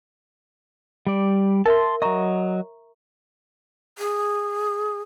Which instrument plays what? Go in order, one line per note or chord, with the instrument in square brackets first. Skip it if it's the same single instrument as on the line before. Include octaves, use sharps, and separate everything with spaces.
[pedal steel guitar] G3 D5
[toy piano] A#4 E5 [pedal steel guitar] A5 C6
[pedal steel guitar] F#3 D#5 [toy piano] E5 A#5 C#6
[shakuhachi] G#4